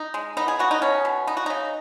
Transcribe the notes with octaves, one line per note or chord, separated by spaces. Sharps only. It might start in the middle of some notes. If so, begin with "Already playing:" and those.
Already playing: D#4
G#3
B3 D#4
G#4
B3 F#4
D#4
B2 C#4
B2
B3 D#4
F#4
C#3 D#4